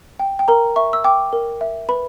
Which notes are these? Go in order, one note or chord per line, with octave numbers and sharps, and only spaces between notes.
G5
G5
A#4 A#5
E5 C#6
E6
G5 D6
A#4
E5
B4 B5